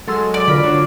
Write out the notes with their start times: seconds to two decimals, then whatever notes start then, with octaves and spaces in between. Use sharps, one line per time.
0.08 F#3 G#3 A4 C6 E6
0.34 D5
0.48 D3 F4 A#4 B5
0.63 D4 F#4 C#5